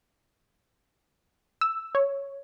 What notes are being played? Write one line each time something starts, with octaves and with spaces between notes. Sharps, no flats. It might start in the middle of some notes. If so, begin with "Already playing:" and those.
E6
C#5